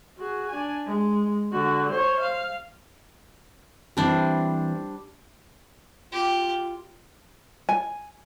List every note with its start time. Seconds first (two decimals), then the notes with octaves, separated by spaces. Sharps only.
0.18 F#4 G#4
0.50 D4 G#5
0.86 G#3
1.52 D3 F#4
1.91 C5 C#5
2.20 F5
3.97 E3 G3 C4 D4 E4 C5
6.12 F4 G4
7.69 G#5